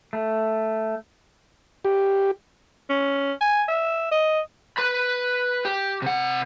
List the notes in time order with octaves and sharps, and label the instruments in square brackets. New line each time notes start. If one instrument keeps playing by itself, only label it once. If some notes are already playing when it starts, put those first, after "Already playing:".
[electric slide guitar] A3
[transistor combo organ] G4
[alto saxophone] C#4
G#5
E5
D#5
[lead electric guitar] B4 B5
G4
C3 F#5